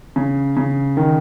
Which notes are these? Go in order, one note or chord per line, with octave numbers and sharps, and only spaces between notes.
C#3
C#3
D#3